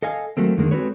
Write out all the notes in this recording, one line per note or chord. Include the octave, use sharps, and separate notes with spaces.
A4 D#5 F5 G#5
F#3 A3 A#3 C4
F2 D3 D#3 G#3 A#3
G#3 C4 F#4 A4 B4 C#5